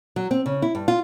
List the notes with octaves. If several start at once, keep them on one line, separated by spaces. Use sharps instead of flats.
F#3
C4
C#3
E4
G2
F4